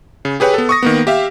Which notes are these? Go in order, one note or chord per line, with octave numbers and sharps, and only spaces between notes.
C#3
G4 G#4 B4 C#5 G5
B3 A4
C#6 D#6 A#6
D#3 A#3 B3
G4 E5 F5